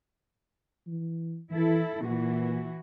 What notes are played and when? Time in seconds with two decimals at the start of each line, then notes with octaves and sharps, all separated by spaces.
0.87 E3
1.51 E3 E4 A4
2.03 A#2 E3 F#4